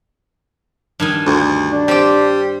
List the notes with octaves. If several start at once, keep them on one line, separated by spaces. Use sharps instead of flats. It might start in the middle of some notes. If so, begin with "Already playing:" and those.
G2 D#3 G#5
D2
D4
G3 C4 C5 D5